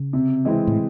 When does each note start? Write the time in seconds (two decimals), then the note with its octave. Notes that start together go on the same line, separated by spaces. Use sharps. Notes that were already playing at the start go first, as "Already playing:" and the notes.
Already playing: C#3
0.13 C3
0.45 E3 G#3 C4 E4
0.67 A2